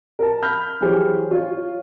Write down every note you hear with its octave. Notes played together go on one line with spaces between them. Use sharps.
A#4 A5
B5 F6 G6
E3 F#3 G4 G#4 C5 C#5
F4 C#5